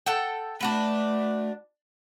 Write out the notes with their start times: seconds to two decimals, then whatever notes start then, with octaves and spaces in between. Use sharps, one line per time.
0.06 A4 F#5 G5
0.61 A3 D4 F#4 B4